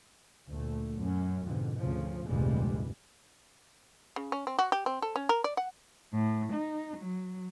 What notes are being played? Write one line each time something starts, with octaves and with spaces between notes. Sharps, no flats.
D2 A#2 A3
F#2 C#4
F2 G#2 B2 D3
D2 C#3 F3
F1 D2 G2 A#2 G3 G#3
C#3
C#4
C4
F#4
G4
C4
A4
C#4
A#4
D5
F#5
A2
D#4
F#3